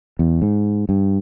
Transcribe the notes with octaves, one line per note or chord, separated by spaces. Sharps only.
E2
G#2
G2